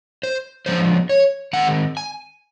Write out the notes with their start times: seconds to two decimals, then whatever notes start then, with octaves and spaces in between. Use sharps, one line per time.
0.23 C5
0.66 F3 G#3 B3 D4 C5
1.09 C#5
1.53 D#3 G#3 C4 F#5
1.97 G#5